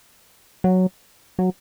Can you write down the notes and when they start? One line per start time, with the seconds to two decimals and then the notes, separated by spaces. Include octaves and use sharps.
0.64 F#3
1.39 F#3